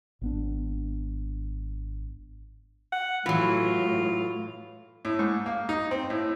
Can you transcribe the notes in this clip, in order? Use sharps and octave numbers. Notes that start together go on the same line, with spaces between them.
G#1 B3 D4
F#5
A2 E3 F#3 F4
A2
G#2
A#3
D#4
C4
A2